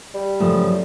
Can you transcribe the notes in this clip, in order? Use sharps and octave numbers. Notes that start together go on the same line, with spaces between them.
G3
F#2 C#3 F3 A3